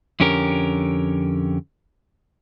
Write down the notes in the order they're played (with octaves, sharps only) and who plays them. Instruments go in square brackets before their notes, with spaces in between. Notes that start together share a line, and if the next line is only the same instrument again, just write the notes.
[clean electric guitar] F2 D3 C#4 G4 A#4